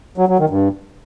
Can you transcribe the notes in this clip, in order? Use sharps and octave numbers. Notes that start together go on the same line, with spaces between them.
F#3
F#3
D#3
G2